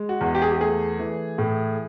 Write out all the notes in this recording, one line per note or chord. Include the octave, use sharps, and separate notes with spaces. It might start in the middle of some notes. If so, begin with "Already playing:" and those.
Already playing: G#3
F#4
E2
G4
G#4
G4
A3 G#4
E3
A2